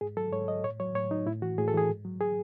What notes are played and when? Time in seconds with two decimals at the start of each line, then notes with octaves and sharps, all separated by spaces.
0.01 G#2 G#4
0.17 F#3 A4
0.32 G#2 C#5
0.48 F#3 D#5
0.64 A2 C#5
0.80 F#3 C#5
0.95 A2 C#5
1.11 F#3 D#4
1.26 A2 E4
1.42 E3 F#4
1.58 A2 G#4
1.68 A4
1.73 E3 G#4
1.89 G#2
2.05 F#3
2.21 G#4